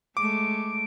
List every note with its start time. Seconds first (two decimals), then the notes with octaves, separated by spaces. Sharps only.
0.17 G#3 A3 D6 D7